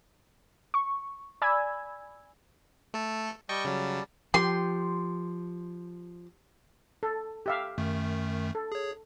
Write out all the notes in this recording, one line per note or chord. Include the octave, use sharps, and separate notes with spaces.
C#6
D5 G#5 B5 E6 G#6
A3 A4
G3 D#5 G5 A5 C#6
C#3 F#3
F3 G4 C6
A4
G4 E5 F5
F#2 D#3 A3
A4
G#4 C#5